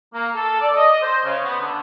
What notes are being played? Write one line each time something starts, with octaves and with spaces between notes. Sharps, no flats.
A#3
A4
D5
D#5
C5
C#3
B3
D3